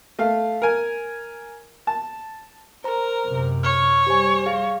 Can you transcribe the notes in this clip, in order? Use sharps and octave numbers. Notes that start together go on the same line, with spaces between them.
A3 F5
A#4 G#5
A5
A#4 C5 A#5
F#2 C3
C#5 F6
G3 G4 C5 G#5
G#4 F5